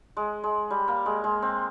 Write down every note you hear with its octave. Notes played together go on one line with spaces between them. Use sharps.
G#3
G#3
G3
A#3
G#3
G#3
C4